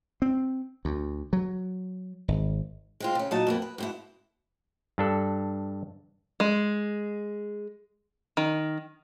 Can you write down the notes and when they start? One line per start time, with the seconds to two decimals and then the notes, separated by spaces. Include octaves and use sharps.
0.22 C4
0.85 D2
1.33 F#3
2.28 G#1
3.00 G#3 C4 F4
3.15 C#3 C#4
3.31 A#2 F#3 D#4 F#4 D#5 A5
3.47 F2 A#3 B3
3.62 B4
3.78 G#2 B2 E4
4.98 G2 D4 A4
6.40 G#3
8.37 D#3